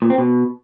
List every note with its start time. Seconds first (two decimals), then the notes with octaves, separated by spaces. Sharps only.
0.02 A#2
0.10 C4
0.18 B2